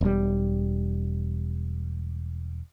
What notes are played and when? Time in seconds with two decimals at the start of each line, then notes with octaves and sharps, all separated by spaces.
0.01 E1 G3